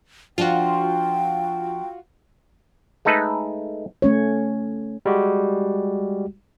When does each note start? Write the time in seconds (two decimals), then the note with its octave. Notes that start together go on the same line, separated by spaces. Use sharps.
0.38 F3 D4 F4 F#4 G5
3.05 G#3 A3 D#4 A4 B4
4.02 A3 C#4 C#5
5.06 G3 G#3 F#4 G4